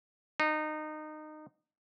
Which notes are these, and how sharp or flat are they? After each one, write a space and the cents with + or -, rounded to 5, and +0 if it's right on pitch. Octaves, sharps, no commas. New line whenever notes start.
D#4 -20